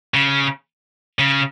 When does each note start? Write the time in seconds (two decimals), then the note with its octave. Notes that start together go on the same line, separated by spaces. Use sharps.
0.14 C#3
1.19 C#3